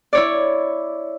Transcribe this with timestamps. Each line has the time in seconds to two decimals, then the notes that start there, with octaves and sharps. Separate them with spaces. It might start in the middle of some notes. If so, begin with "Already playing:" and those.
0.13 E4 C#5 D5